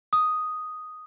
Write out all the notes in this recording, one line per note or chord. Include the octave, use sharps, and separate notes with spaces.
D#6